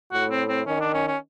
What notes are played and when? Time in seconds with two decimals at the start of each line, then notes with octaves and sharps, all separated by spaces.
0.13 A2 F#4
0.31 C4
0.49 C4
0.67 D#3 C#4
0.80 D4
0.94 C#4
1.08 C#4